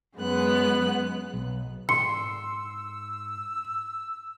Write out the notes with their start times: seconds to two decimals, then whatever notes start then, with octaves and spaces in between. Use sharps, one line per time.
0.17 F#2 G#3 B3 F#6
1.34 B1
1.89 G#2 C6 E6 C#7